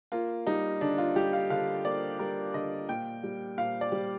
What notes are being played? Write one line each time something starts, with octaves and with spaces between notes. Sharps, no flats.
A#3 F4
G3 D#4
D3 D4
F4
G3 G4
F5
D3 F5
A#3 D5
G3 A#4
D3 D#5
A#2 G5
G3
A#2 F5
D5
G3